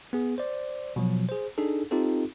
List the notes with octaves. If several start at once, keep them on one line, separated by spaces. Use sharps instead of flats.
B3 G#4
C5 D5
B2 F3 F#3
G#4 C5
D4 D#4 G#4 A4
C4 D#4 F4 G4 A4